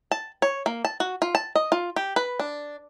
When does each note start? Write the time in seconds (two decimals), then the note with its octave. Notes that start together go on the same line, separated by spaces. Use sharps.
0.11 A5
0.42 C#5
0.66 A#3
0.85 A5
1.00 F#4
1.22 F4
1.35 A5
1.56 D#5
1.72 F4
1.96 G4
2.16 B4
2.40 D4